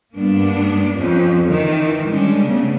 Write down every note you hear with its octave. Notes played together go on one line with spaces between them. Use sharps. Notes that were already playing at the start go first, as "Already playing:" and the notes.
G2 A#3 B3 D4
F2 C#4
D#3 E3
G3 G#3 C#4 D4
C#3 A3 B3